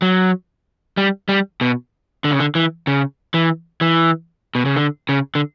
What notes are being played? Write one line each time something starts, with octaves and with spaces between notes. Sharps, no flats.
F#3
G3
G3
B2
D3
C#3
D3
E3
C#3
E3
E3
B2
C#3
D3
C#3
D3